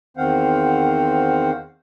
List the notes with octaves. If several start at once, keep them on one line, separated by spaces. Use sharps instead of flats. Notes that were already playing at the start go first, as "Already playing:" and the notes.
E2 D#3 C4 C5 F5 F#5